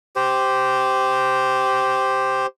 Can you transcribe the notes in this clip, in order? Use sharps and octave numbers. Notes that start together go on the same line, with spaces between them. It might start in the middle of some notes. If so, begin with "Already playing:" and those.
G4 C5